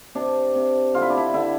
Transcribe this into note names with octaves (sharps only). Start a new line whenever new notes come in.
C3 D4
C3
D3 F4
E4
D4
E4
D3 E4